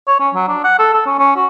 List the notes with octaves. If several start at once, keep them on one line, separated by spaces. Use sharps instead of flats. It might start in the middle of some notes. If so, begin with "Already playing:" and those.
C#5
C#4
F#3
D4
F#5
A4
A4
C#4
C#4
F#4